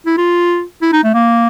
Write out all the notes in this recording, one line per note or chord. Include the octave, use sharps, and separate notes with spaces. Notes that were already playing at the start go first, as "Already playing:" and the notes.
E4
F4
E4
D#4
A3
A#3